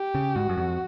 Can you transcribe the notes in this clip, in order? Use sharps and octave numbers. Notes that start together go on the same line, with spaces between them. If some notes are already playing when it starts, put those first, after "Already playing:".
Already playing: G4
C#3
G#2 F#4
F#2
F2